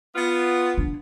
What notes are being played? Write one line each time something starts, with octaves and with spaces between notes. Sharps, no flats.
B3 F4
D4